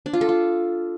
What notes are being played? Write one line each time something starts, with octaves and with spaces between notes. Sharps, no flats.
D4
F4
A4
F4